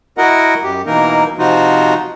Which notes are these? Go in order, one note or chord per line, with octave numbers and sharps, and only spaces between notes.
E4 F#4 A#4 D#5 F#5
F#2 G4
B2 E3 A#3 D#4 A#4
C3 F3 D#4 F4 F#4